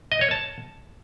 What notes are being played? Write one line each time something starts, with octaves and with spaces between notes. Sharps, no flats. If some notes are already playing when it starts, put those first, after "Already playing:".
D#5
C#5
A5